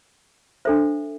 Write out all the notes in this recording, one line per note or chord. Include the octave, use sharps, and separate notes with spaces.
D4 A4 C5 E5